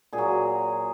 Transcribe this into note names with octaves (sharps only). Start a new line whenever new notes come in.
A#2 G#4
F#3